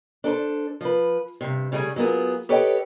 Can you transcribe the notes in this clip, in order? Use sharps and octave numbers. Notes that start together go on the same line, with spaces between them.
D4 A4 A#4 C5
F3 B4
G2 C3
C#3 G3 A3 E4 G#4 A4
F#3 A#3 B3 F4 G#4
G4 A4 B4 C#5 D#5 G5